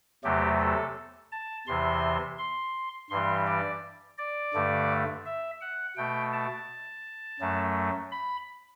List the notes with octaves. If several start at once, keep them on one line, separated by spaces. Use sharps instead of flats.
E2 C3 F#3 A3 G4
A4
A5
E2 C3 E3 C6
C6
G2 E3 G3 C6
D5
D5
G2 D3 A3
E5
F#5
B2 A3 G5
A5
F#2 F#3 A3
B5